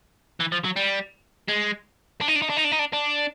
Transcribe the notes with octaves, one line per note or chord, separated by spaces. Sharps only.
E3
F3
F#3
G3
G#3
D4
D#4
D4
D#4
D4
D#4
D4
D#4
D4
D4